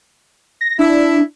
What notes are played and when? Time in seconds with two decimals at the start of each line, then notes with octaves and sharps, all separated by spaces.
0.61 A#6
0.79 D4 E4